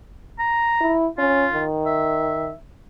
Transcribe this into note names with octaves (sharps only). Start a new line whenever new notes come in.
A#5
E4
C#4 F4
D#3
E5